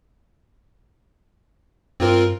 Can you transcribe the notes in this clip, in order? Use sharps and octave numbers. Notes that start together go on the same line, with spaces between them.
G2 C4 F4 A#4